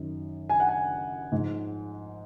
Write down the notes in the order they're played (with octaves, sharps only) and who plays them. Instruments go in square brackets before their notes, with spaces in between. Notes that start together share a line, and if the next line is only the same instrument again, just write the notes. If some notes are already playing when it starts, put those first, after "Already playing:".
Already playing: [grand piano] F#2 D#3
G#5
F#5
G#5
G#2 F3